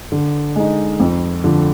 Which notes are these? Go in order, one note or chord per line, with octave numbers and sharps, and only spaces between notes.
D3
G#3 D#4
F2
D3 F3